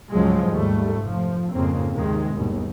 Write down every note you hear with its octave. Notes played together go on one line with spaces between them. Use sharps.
C#2 G#2 F3 F#3 G#3
D#2 G#2 G3 A3
F1 F3
F2 G#2 C#3 A#3 C4
D#2 C3 D#3 G#3
G1 D#2 B2